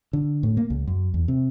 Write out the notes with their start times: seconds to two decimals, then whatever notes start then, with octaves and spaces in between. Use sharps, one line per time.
0.13 D3
0.43 A2
0.57 A#3
0.70 C#2
0.87 F#2
1.14 E2
1.28 C3